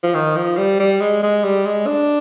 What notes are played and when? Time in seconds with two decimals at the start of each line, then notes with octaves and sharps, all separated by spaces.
0.03 F3
0.14 D#3
0.36 F3
0.57 G3
0.79 G3
1.01 G#3
1.23 G#3
1.44 G3
1.66 G#3
1.87 D4